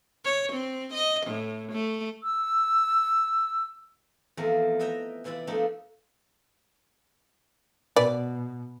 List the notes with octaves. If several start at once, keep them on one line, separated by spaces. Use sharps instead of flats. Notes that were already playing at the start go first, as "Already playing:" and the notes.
C#5
C4
D#5
A2
A3
E6
E2 F3 A3 C4 A#4
B4 D#5 E5 G5 A#5
C3 E3 E4 D5 B5
F3 A3 B3 C4 D4 D#4
B2 B4 D5